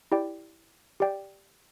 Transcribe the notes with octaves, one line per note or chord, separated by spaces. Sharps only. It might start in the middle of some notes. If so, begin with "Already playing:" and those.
E4 G4 D5 G5
G4 D5 G5